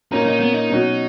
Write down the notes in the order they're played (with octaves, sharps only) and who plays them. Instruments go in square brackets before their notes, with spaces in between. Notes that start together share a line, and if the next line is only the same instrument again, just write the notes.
[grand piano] A#2 A#3 C#4 [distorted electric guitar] D#4
[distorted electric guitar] D#4
B3
D#4
[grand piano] B2 F#3 C#4 F#4